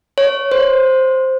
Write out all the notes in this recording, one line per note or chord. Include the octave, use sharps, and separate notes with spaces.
C#5
C5